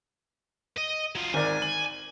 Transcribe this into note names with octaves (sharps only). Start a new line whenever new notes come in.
D#5
F#3 F4
G#1 A#4 D5 G#5
F#7